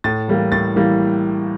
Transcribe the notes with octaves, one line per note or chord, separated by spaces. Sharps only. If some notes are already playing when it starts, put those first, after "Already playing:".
A2 A6
E3 G3 A#3
A2 A6
E3 G3 A#3